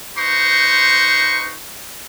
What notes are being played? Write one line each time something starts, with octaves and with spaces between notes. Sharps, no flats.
D#4 B4 C5 A#5 C6 C#6